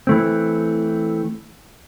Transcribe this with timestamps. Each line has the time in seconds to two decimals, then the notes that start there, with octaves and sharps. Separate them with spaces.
0.07 E3 A3 C4